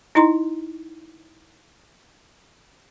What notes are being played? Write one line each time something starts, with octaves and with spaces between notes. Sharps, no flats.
D#4 E4 D#5 A#5 C6